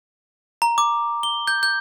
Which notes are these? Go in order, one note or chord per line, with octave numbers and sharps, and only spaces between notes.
A#5
D6
G7
G6
G6